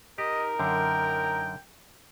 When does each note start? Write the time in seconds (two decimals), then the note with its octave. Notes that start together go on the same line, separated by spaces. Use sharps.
0.18 D#4 G4 A#4 D#5
0.59 F#2 D3 G5